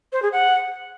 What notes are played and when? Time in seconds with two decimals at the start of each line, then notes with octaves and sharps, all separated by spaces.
0.12 C5
0.22 G#4
0.32 F#5